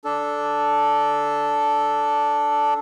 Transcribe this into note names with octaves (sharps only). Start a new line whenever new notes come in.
D4 A4